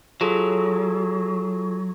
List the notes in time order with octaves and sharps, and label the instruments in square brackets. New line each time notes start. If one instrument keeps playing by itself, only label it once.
[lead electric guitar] F#3 [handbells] F4 G#4 A4